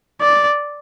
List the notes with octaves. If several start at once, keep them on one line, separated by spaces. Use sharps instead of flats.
D5